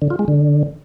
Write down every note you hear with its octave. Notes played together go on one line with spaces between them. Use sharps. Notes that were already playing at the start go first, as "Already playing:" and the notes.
D3
F4
G#3
D3